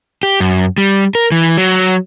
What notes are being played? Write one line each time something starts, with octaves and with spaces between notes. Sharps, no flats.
G4
F#2
G3
A#4
E3
F#3